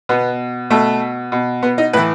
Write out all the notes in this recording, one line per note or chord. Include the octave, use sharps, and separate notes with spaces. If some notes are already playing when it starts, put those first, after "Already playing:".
B2 B3
B2 A3
B2
B3
D#4
A2 E3 B4